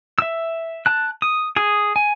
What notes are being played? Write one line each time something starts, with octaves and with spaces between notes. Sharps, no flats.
E5 E6
A5 F#6
D#6
G#4 D#6
G#5